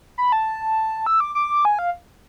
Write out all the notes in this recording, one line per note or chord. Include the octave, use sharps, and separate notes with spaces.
B5
A5
E6
D6
D6
G#5
F5